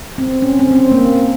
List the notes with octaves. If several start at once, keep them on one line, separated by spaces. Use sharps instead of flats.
C4
C#4
C4
C4
C#4
A#3